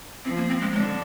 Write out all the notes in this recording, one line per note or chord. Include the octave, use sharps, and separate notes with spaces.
F3 C4
A#3
C4
G#3
D3 G#3